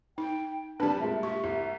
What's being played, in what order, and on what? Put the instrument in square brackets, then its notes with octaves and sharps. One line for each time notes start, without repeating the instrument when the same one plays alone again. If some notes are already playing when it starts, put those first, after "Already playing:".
[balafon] D#4 [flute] G5
[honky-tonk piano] G3 C4 B4 [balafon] D4 [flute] A5
[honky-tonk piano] A#2 G#3 [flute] E5
[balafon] G4 [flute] E5
[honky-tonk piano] C2